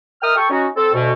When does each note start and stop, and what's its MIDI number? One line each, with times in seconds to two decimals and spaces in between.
0.21 0.35 70
0.21 0.35 75
0.21 0.35 76
0.21 0.35 79
0.21 0.35 87
0.21 0.35 89
0.37 0.48 69
0.37 0.48 79
0.37 0.48 85
0.50 0.66 61
0.50 0.66 63
0.50 0.66 66
0.76 0.93 60
0.76 0.93 69
0.93 1.12 38
0.93 1.12 47